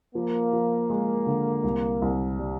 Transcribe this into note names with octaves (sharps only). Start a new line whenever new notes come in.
F3 A#3
F3
G#3
D3
C2
C2
G3